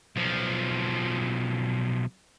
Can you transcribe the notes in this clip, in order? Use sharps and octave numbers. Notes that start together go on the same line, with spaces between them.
B1 F3